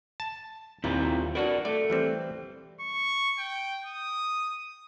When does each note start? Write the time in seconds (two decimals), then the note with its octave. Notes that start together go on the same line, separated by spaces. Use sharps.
0.20 A5
0.84 D#2 A#2 C4 E4 F4
1.35 D4 F#4 A#4 B4 D5
1.65 A3 D5
1.90 E3 G3 C4
2.81 C#6
3.39 G5
3.86 D#6